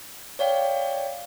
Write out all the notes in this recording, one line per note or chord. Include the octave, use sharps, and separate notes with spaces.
C#5 D5 F5 G5